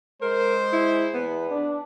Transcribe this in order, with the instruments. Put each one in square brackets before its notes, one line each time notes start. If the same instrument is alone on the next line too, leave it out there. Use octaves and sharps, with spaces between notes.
[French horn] G#3 [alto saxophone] A#4 [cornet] C5
[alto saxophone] E4
[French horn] E2 [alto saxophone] B3
[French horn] D4